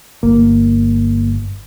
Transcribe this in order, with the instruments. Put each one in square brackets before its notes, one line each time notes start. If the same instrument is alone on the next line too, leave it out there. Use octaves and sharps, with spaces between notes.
[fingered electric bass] G1 [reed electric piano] A#3